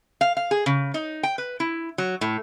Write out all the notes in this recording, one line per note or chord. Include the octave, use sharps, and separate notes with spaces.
F5
F5
G#4
C#3
D#4
G5
B4
E4
F#3
A2